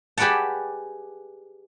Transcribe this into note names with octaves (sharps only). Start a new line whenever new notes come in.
G4 G#4 B4 D5 F#5 A5